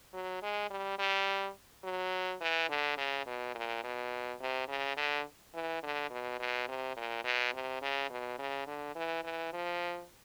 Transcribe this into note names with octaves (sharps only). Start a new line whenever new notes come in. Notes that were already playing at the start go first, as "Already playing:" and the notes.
F#3
G#3
G3
G3
F#3
E3
D3
C#3
B2
A#2
B2
C3
C#3
D3
E3
D3
B2
B2
C3
A#2
B2
C3
C#3
B2
C#3
D3
E3
E3
F3